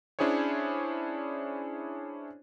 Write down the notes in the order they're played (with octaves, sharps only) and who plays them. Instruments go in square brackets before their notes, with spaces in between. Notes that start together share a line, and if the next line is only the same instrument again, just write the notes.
[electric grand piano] C#4 D4 E4 G#4 C5 C#5